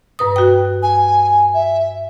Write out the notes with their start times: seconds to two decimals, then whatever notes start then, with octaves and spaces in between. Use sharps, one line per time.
0.19 G2 B4 D#6
0.36 F#4 G5
0.83 G#5
1.54 E5